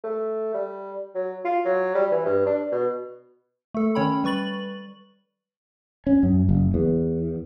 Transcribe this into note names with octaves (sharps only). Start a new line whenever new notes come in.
A3
G3
F#3
F4
F#3
G3
E3
G2
D4
B2
A3 A4
D#3 C#4 C#5 G5 B5
G3 B4 C#6 A6 F#7
C#4
F#2
F#1
E2